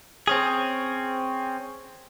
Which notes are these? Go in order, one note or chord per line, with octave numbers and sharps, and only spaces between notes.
C4 C#4 G#4